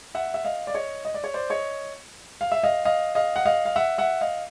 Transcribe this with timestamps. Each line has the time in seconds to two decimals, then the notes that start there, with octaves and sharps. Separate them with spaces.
0.15 E5 F#5
0.34 E5
0.45 D#5 F5
0.67 D5
0.74 C#5 D#5
1.05 D#5
1.14 D5
1.24 C#5
1.34 C5 D5
1.50 C#5 D#5
2.41 F5
2.52 E5
2.63 D#5 F5
2.85 D#5 F5
3.15 D#5 F5
3.36 F#5
3.45 D#5 F5
3.65 F5
3.76 E5 F#5
3.98 E5 F#5
4.21 D#5 F5